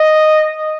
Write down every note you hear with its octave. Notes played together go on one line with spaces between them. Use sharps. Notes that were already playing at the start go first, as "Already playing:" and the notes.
Already playing: D#5